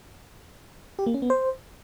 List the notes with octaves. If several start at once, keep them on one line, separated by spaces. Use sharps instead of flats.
G4
A#3
C#4
B3
C5